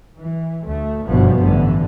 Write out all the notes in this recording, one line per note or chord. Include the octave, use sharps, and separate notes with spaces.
E3
D2 A3
G1 F#2 B2 E3 F3 B3
A1 G2 D3 E3